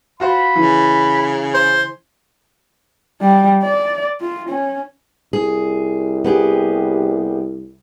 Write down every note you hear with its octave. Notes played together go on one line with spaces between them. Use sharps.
F4 F#4 C5 B5
C#3 E3
C5
G3
D5
F4
C#4
C2 G#4
B3 G4 G#4